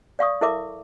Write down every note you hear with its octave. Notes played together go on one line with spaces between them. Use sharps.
D5 F5 C#6 D#6
E4 A4 A#4 E5 D6